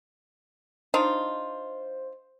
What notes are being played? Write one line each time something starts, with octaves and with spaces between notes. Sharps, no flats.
D4 D#4 F4 C5